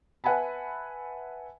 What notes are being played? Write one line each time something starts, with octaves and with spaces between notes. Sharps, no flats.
B4 E5 F#5 G#5 A5 B5